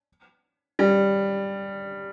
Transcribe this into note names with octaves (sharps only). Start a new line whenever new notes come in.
G3